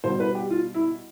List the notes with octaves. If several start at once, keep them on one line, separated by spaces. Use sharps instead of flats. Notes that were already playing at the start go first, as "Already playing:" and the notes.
B2 G3 C5
B4
G4
F4
E4